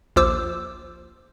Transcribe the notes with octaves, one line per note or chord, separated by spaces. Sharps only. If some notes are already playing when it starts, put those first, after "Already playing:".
A#1 D#2 F4 C5 D6 E6